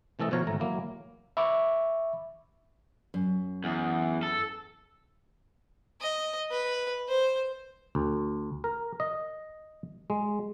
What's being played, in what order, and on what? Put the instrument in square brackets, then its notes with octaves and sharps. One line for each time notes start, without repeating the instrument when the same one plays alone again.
[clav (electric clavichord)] C3 E3 A3 A4 D#5
B2 F3 F4 C#5 F5 A#5
G#1 A3 A#5
F#3 A#3 E4
[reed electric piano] E5 B5 C#6 D6
[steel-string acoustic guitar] F#2
[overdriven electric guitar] E2
A4
[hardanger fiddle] D#5
B4
C5
[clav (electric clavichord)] D2
A#4
D#5
G#3